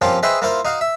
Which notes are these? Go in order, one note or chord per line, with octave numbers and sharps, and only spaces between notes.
F3 A#3 C4 C#4 F4 G4
G#4 B4 C5 D#5 E5 G5
A#3 E4 F4 A#4 C5 F5
D#4 F#4 F5
E5